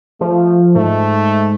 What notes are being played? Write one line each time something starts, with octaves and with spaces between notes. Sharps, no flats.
F3 A3
G#2 A3